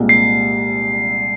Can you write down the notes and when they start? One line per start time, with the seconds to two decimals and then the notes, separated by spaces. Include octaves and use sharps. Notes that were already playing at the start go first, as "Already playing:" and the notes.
Already playing: C2 A#2 G#3 C4
0.09 C7